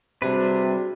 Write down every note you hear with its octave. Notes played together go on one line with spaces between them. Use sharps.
C3 G3 D4 F#4 G#4 B4